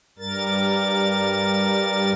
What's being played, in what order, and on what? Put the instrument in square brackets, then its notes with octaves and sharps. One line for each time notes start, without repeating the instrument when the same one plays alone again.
[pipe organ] G2 G3 A#4 A6